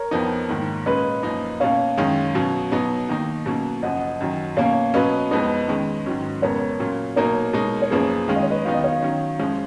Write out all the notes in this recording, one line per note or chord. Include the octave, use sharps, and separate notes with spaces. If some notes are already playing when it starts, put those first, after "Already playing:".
Already playing: A#4 C#5
F2 F3 B3 D#4
G#2 D#3 A#3
A#2 G#3 C#4 B4 D#5
F#2 F3 A#3 D#4
B2 A#3 C#4 C#5 F5
F#2 D#3 G#3 C#4
B2 F#3 C#4
B2 F#3 B3 D#4
D#3 A#3 D#4
B2 F#3 A#3 C#4
F#2 C#3 F3 D#5 F#5
F#2 D#3 F#3
B2 A#3 C#4 C#5 F5
B2 F#3 C#4 B4 D#5
F2 F3 G#3 B3 D#4 B4 D#5
D#3 G#3 C#4
G#2 D#3 F#3 C#4
F2 C#3 G#3 B3 A#4 C#5
A#2 F#3 C#4
B2 F#3 A#3 D#4 A#4 C#5
B2 G#3 D#4
C#5
F#2 F3 A#3 C#4 G#4 B4
D#3 G#3 C#4 F5
D#5
C#5
B4 D#5
D#3 F#3 B3 D#4 F5
D#5
C#5 F5
D#3 F#3 C#4
F#2 F3 G#3 C#4